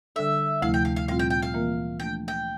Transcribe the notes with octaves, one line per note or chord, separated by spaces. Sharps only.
D3 G3 D4 A4 E5
D2 C3 F3 A3 E4 F5
G5
F5
F5
A#2 G3 C4 F4 F5
G5
G5
F5
E3 A#3 F4 A#4
F3 A3 D4 G5
G5